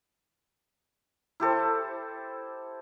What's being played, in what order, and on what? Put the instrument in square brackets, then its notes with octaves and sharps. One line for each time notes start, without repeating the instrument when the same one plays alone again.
[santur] E4 G4 A4 C5